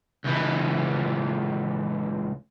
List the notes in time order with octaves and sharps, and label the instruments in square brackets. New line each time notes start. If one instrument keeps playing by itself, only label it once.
[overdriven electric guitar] C#2 E3